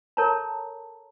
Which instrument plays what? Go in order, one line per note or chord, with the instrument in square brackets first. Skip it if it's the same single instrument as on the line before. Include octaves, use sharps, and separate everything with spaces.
[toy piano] A4 A#4 C#5 A5 A#5